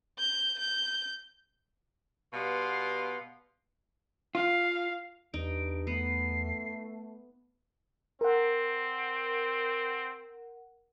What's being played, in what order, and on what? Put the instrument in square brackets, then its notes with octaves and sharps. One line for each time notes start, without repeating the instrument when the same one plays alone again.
[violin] G6
G6
[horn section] B2 G3 B3 F5 C6
[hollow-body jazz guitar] F4 [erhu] F5
[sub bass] E2 [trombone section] G2 [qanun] D#4 [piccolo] D7
[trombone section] A3 [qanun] B3 [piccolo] C7
[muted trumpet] C4 [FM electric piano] A#4 F#5